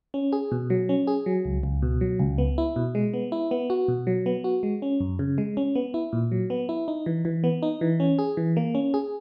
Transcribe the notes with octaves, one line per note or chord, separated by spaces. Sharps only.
C#4
G#4
B2
F#3
C#4
G#4
F#3
C#2
C#2
B2
F#3
C#2
B3
E4
B2
G#3
B3
E4
B3
F#4
B2
F#3
B3
F#4
G#3
C#4
F#2
C#3
G#3
C#4
B3
E4
A#2
F#3
B3
E4
D#4
E3
E3
B3
D#4
E3
C#4
G#4
E3
A#3
C#4
G#4